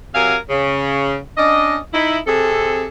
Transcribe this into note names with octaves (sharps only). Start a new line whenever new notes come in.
C3 F#3 A#4 F5 G#5
C#3
C#4 D4 D5 D#5
D#4 E4
C3 C4 G#4 A4